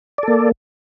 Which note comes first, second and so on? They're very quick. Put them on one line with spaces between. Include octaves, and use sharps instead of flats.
D5 A4 A#3